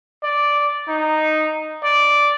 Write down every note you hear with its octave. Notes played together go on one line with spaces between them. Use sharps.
D5
D#4
D5